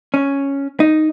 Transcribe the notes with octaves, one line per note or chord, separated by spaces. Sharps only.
C#4
D#4